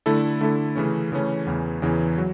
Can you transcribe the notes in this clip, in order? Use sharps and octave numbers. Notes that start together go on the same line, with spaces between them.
D3 A3 E4 A4
D3 A3 E4 A4
C#3 E3 A3 C#4
C#3 E3 A3 C#4
E2 C#3 E3
E2 C#3 E3
F#3